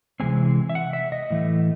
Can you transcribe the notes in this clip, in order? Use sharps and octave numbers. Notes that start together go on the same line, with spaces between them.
C3 E3 G#3 C4 G#5
E5
F#5
E5
D#5
A2 E3 A3